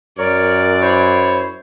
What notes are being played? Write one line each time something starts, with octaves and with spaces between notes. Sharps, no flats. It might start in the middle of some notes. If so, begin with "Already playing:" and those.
F#2 A#4 C#5 D5
E4 C5 C#5